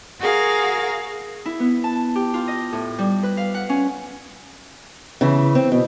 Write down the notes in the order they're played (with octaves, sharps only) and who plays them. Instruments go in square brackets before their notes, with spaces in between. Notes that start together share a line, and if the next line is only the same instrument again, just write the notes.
[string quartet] F#4 G#4 A#4 F5
[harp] E4
B3
A5
G4
F4
D#5
A2
G3
B4
F5
F#5
C#4
[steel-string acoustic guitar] C#3 E3
C4
B2